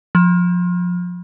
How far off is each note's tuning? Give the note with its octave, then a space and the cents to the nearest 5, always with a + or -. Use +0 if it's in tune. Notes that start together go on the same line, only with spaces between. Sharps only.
F3 +25